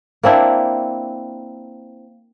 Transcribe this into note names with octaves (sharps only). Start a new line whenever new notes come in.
A#3 C4 D4 E4